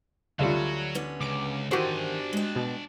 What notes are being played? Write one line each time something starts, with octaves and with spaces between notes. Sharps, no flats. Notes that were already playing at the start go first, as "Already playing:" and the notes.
D2 F#3 G3 F4 F#4
B3 C#4 D4
C#2 D6 D7
D#3 E3 D4 F#4 G4 C5 G#5
G#3 G5
B2